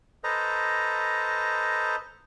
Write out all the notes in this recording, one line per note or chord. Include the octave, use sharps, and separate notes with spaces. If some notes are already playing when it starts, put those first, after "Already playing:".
A4 B4 C5 D#5 A#5